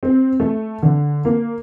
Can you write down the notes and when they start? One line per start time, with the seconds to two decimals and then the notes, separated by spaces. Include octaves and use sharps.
0.03 C4
0.40 A3
0.82 D3
1.25 A#3